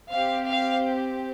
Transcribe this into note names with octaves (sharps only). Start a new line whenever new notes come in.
C4 G4 F5
F5